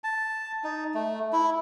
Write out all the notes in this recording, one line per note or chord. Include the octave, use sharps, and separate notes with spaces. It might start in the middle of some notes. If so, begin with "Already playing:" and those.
A5
D#4
A3
E4